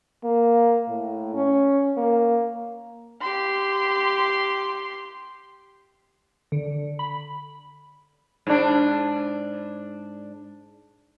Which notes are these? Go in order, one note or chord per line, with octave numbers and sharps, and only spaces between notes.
A#3
A2
C#4
A#3
G4 C6
D3
B5
G#2 D4